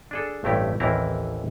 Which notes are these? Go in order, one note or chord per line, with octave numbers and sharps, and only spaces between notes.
D4 G#4 A4
A1 G2 A3 C4 E4 G4
A1 D#2 E3 C4 E4 A#4